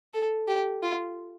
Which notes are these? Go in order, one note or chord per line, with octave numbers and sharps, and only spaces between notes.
A4
G4
F4